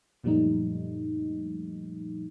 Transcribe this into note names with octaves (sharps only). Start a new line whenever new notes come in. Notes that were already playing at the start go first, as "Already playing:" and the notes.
F#2 A#2 F3 G3 A3 D#4